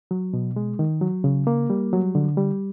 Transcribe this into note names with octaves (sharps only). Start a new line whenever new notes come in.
F#3
B2
G#3
D#3
F#3
C#3
A#3
G3
F#3
D3
G3